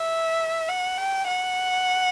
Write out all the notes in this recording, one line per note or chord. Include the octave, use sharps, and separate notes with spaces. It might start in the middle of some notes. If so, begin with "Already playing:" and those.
Already playing: E5
F#5
G5
F#5